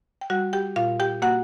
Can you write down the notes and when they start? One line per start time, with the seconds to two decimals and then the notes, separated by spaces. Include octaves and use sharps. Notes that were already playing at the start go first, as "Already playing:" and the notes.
0.21 G5
0.30 G3 F#4 F#5
0.53 G4 G5
0.76 A#2 F4 F5
1.00 G4 G5
1.22 A#3 F#4 F#5